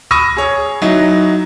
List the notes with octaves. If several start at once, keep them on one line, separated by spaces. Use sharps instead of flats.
B5 C#6 D#6 E6 A#6 D#7
G#4 C#5
F#3 D#4 E4